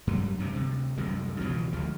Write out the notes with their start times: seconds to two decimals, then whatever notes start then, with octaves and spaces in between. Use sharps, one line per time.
0.07 G2 F#3 G3
0.39 C2 G2 C3 C4
0.53 D2 C3
0.97 C2 F#2 D#3 G#3
1.40 C#2 B2 E3 F3
1.72 D2 F3 G#3